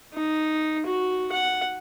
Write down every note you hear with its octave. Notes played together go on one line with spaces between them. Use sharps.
D#4
F#4
F#5